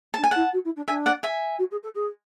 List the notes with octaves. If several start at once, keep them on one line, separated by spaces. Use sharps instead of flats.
D4 A5
G#5
E4 F#5 A5
F#4
E4
D4
D4 E5 G#5
D5 F#5
E5 G#5
F#4
G#4
A4
G#4